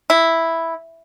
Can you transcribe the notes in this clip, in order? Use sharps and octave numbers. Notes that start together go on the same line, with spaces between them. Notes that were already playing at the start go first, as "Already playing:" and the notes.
E4